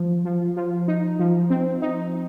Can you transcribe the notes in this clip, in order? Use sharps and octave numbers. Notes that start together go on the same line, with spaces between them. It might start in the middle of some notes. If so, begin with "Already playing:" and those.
Already playing: F3
F3
F3
D#4
F3
C4
D#4